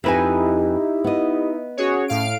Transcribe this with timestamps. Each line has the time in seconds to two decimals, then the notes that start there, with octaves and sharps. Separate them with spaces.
0.04 F2 D#4 E4 G4 B4 G#5
1.04 B3 D#5
1.77 C#4 F#4 G#4 C#5
2.08 A2 F5 D7